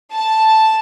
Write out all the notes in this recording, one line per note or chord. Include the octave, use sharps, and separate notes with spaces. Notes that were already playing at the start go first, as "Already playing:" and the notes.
A5